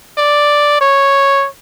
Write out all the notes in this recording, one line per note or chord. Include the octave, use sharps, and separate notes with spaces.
D5
C#5